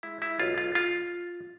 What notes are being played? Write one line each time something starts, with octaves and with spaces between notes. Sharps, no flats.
G#3 E4
E4
B1 F4
F4
F4